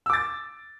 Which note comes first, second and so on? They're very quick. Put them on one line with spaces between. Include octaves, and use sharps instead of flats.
E6 D6 A6